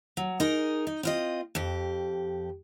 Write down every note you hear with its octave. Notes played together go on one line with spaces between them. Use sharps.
F#3
D#4 G#4 A#4
D#4
C4 F4 D#5
F2 G4